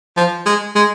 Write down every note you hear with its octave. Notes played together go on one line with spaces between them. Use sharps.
F3
G#3
G#3